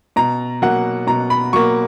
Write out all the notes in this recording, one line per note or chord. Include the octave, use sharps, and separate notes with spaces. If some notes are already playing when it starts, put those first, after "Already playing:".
B2 A#5
F#3 A#3 F#5
B2 A#5
B5
F#3 A#3 C#6